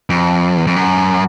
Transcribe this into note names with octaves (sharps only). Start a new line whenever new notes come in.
F2
E2
F2
F#2